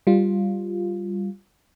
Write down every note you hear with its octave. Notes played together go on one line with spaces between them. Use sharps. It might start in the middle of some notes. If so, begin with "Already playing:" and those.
G3 F4